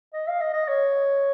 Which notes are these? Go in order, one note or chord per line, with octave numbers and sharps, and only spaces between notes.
D#5
F5
D#5
D#5
C#5